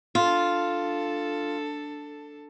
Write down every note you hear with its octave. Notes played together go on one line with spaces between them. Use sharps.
D4 F4 A4